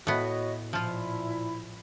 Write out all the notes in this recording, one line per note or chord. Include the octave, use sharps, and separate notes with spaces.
A2 B3 F#4 C#5 D#5
A#2 F3 E4 F4